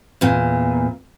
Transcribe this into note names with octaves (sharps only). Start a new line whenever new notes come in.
E2 A#2